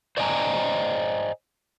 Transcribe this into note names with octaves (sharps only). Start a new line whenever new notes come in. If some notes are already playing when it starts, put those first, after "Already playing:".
C5 D5 D#5 G5 G#5 A#5